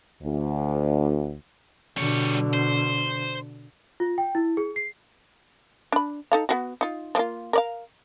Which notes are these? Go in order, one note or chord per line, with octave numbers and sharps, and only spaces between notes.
D2
B2 D3 G3 C#5
C5
F4
G5
E4
G#4
C7
D4 B5
D#4 A4 F5
B3 F4 F#4
D#4 F4
F3 A#3 F4
A#4 D5 F5